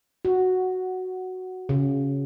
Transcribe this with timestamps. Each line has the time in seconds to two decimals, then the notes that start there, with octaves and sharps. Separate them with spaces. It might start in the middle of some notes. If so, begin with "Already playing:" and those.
0.25 F#4
1.69 C#3